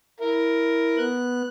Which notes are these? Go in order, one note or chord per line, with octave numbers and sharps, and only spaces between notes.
E4 A#4
B3 F#6